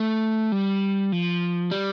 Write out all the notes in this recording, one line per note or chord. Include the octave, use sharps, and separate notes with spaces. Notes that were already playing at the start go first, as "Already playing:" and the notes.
Already playing: A3
G3
F3
G3